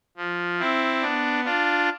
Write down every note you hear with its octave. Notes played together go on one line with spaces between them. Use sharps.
F3
C4 E4
B3 D4
D4 F4